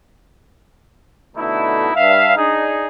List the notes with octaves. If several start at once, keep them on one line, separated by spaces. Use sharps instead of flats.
B2 D3 A3 D#4 E4
G2 E5 F5
D4 D#4 G#4